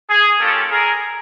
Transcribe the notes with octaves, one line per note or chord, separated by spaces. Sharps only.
G#4
A#3 C#4 F4 G4 A4
G#4 A#4